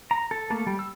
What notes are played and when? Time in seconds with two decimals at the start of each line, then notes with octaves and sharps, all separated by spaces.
0.11 A#5
0.31 A4
0.50 A3 A#3 A4
0.67 G3
0.79 E6